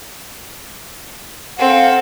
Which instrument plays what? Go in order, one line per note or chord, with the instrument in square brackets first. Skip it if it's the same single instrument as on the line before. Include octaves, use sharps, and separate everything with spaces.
[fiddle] C4 A4 [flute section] F5 F#5